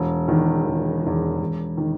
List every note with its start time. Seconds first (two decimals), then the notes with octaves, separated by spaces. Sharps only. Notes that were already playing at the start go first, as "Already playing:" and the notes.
Already playing: E1
0.28 E2 D#3
0.65 E1
1.03 E2 D#3
1.40 E1
1.77 D#3